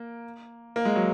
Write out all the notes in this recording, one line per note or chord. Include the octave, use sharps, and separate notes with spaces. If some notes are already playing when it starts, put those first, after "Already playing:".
Already playing: A#3
A#3
G#3
F#3